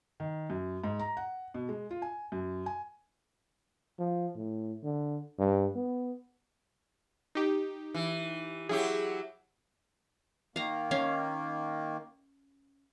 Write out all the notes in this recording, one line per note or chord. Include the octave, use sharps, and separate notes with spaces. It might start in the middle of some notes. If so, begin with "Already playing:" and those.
D#3
F#2
G#2
A#5
F#5
B2
G#3
F4
G#5
F#2
G#5
F3
A2
D3
G2
B3
D#4 G4
E3
F#3 E4 G4 G#4
D#3 A#3 F5 A#5
C#4 F5